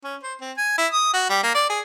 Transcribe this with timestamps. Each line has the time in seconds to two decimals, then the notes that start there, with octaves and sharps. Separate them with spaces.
0.04 C#4
0.23 C5
0.41 C4
0.57 G#5
0.78 E4
0.92 D#6
1.13 F#4
1.30 G3
1.43 A#3
1.55 D5
1.69 G#4